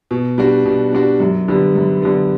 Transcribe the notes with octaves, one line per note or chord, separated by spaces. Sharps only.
B2
G3 D4 F#4
B2
G3 D4 F#4
F#2
D3 G3 B3
F#2
D3 G3 B3